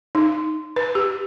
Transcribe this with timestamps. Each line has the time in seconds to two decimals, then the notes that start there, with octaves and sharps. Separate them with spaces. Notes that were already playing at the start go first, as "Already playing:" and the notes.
0.15 D#4
0.76 B4
0.95 G4